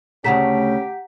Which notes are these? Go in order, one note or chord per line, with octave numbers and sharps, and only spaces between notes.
D2 C#3 A3 C#4 G4 F#5 A#5 B6